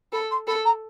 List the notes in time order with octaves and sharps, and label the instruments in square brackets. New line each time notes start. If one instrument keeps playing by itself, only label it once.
[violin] A4 [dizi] B5
[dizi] C6
[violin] A4 [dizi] B5
[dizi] A#5